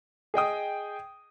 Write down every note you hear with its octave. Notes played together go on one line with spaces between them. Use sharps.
G#4 D#5 G5 D#6